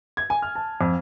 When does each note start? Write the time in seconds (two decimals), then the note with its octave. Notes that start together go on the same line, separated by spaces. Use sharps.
0.17 G#6
0.30 G#5
0.42 F6
0.55 A5
0.81 F2